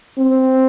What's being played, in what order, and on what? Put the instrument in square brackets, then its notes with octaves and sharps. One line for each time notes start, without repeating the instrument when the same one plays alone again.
[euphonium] C4